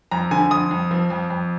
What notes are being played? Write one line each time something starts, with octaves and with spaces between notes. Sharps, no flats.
F2 A#5
D3 G#5
F2 D#6
F2
F3
F2
F2